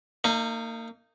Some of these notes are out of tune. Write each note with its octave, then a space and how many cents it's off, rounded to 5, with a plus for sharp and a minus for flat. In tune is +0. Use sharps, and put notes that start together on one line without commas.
A#3 -35 D#4 +0